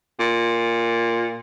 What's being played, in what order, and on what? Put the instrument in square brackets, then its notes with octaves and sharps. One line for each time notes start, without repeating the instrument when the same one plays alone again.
[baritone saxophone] A#2